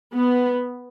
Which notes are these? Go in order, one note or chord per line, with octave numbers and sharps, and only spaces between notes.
B3